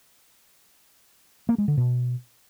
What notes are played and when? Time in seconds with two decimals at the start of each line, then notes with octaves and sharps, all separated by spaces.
1.49 A#3
1.58 G#3
1.68 D3
1.77 B2